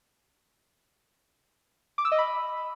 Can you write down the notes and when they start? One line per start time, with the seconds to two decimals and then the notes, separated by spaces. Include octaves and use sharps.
1.98 D6
2.05 E6
2.12 D#5
2.18 B5